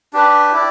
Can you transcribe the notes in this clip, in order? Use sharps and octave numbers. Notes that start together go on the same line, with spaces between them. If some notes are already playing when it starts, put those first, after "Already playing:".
D4 G4 B4
E4 G4 D5